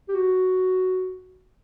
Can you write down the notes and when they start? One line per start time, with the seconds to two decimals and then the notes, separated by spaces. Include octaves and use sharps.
0.09 G4
0.15 F#4